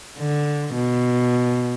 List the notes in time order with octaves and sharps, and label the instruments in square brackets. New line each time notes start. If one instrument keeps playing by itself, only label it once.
[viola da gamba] D3
B2